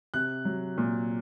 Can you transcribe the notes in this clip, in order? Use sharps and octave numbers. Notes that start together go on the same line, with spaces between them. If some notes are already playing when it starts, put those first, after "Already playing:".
C3 F#6
F#3
A#2